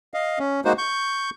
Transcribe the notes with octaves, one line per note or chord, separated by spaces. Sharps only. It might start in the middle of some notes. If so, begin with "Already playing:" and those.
D#5 F5
C#4
G#3 A#3 D#4 F#4 C5
C#6 G6